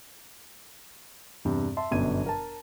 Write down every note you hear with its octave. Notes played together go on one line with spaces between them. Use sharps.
E2 G2 C3
E5 A5 C6
G1 F#2 B2 D4 G#6 D#7
A#4 A5